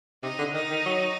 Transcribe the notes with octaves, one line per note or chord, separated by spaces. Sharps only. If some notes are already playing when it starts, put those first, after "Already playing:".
C3 D#4
D3
D#3 D#4
D#3
F#3